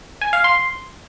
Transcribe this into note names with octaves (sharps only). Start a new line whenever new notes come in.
G#5
F5
C6